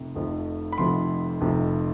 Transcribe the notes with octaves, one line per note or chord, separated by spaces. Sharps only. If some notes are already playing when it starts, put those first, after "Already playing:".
Already playing: F1 F2 C3 F3
F1 F2 C3 F3
B5
F1 F2 C3 F3 C6
F1 F2 C3 F3